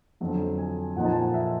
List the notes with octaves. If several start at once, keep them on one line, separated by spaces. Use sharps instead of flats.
F2 D3 F#3
G#5
A#2 F3 A#3 D#4 F#5
A5
G#5
F#5
E5